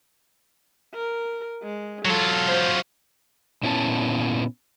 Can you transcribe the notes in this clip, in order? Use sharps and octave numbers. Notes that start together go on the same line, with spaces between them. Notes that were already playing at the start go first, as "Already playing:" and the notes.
A#4
G#3
F#3 F4 A4
C5
A#2 B3 C#4 E4 A#4 A5